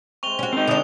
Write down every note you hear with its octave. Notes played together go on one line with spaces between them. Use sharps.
C3 G#3 C#6 F7 G7
C#4 F#4
D#3 C4 D#4
D3 D4 E4 E5 G#5 D#6 F7